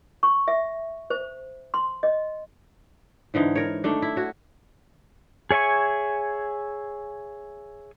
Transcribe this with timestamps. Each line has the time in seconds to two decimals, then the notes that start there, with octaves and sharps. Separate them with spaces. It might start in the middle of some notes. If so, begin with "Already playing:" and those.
0.23 C#6
0.48 E5
1.10 C5
1.74 C6
2.03 D#5
3.34 G#2 D3 E3 D#4
3.55 A#4 C#5
3.84 D#3 A3 D4
4.02 E4
4.16 F#4 C#5
5.51 G#4 C#5 E5 G#5 C#6